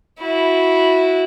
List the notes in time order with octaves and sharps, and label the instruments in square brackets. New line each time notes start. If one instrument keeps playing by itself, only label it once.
[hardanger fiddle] E4 F#4